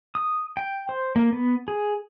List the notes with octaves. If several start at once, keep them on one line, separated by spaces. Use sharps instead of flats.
D#6
G5
C5
A#3
B3
G#4